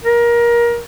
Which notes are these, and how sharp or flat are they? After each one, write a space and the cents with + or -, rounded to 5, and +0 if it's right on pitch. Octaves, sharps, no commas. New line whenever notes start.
A#4 +25